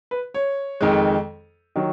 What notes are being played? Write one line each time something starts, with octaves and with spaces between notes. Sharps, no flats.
B4
C#5
F2 D#3 G#3
D#3 F#3